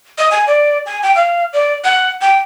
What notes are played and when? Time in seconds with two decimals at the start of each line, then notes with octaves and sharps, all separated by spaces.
0.18 D#5
0.31 G#5
0.47 D5
0.86 G#5
1.03 G5
1.15 F5
1.53 D5
1.84 F#5
2.21 G5